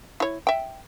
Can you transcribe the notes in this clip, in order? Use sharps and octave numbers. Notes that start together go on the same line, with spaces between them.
E4 C#5
E5 G5